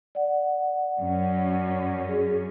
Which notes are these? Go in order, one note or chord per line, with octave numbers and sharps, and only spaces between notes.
D5 F#5
F#2 C#4
G#4